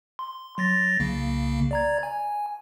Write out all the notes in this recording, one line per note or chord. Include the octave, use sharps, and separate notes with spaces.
C6
F#3 A6 A#6
C2 C#3 A#3
D5 A#5 G#6
G#5